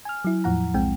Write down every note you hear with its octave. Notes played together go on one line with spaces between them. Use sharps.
G#5 F6
F#3 E4
E2 A2 F3 F#5 A#5
B1 G#3 C4 G5